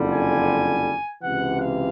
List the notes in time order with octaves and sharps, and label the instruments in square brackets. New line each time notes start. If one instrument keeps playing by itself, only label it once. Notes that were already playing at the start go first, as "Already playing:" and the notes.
Already playing: [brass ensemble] F#1 F2 D3 G3
G#5
C#2 C3 E3 F#5
F5